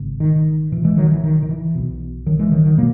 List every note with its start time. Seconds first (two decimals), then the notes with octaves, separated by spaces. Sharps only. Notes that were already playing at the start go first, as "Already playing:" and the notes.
Already playing: G#1 C#3
0.20 D#3
0.72 B1 A#2 E3
0.84 E3 G#3
0.97 D#3 F#3
1.10 E3
1.24 D#3
1.43 D#3
1.49 E3
1.75 B1 B2
2.26 D#3 F#3
2.39 E3 G#3
2.52 D#3 F#3
2.65 D#3 F#3
2.78 B2 F#3 A#3